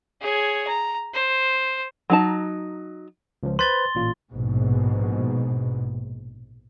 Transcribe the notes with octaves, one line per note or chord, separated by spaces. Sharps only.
G#4 C#5
A#5
C5
F#3 D#4 A5
C#2 F3
B4 C5 B5 C6 A6 G7
A1 A#2 F4
A#1 G#2 B2